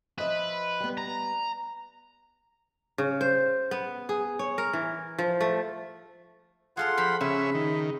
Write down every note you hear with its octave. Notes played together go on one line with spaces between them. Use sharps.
F3 B4 D#5 E5
G3 B3
A#5
C#3
C5
B3
G#4
C#5
A#4
E3
F3
A3
F4 G#4 A4 F5 F#5 C6
F3 G4 B5
C#3 C#4 E5 B5
D#3